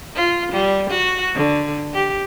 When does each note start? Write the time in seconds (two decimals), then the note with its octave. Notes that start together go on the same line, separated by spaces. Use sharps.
0.15 F4
0.52 G3
0.90 F#4
1.34 D3
1.94 G4